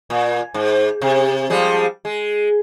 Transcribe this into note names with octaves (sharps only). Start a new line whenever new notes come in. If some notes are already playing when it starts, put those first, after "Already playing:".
A#2
G#2
C3
F3 G3 G#3
G#3